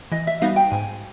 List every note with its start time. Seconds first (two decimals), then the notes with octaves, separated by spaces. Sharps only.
0.12 E3 D#5
0.27 E5
0.41 G3 B3 D#4 F#4 F5
0.56 G5
0.71 G#2 G#5